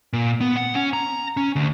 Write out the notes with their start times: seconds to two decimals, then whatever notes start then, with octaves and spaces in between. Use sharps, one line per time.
0.13 A#2
0.41 B3
0.56 F#5
0.75 C#4
0.93 A#5
1.37 C#4
1.56 D2